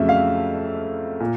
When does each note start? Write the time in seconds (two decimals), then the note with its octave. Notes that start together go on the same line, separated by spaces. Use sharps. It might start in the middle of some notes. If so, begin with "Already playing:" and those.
Already playing: F2 C#3 F#3 A3 E5
0.09 F5
1.20 A#2